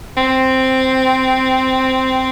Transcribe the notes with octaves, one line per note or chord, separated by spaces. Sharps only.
C4